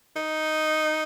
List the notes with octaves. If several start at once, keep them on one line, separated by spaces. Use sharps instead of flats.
D#4